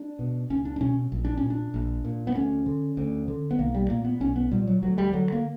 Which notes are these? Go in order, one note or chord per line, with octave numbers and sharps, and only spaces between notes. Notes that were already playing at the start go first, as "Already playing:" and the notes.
Already playing: D4
B2
C#2 C#4
D4
D4
B2 C#4
A#1
D4
C#4
A#2
D4
A#1
A#2
B3
D2 C#4
D3
D2
D3
B3
B1 A#3
G3
A#2 A#3
B3
B1 C#4
B3
A#2 G3
F#3
D2 F#3
G3
D3 F#3
A#3